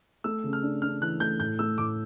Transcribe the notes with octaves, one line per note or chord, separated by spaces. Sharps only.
A3 E6
C#3
F6
D4
D4 F6
E3 F#6
A3 G6
A2 G6
A3 E6
A2 D6